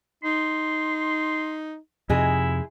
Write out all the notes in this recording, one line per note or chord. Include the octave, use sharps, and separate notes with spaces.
D#4 C6
F2 C3 G#3 D#4 E4 G#4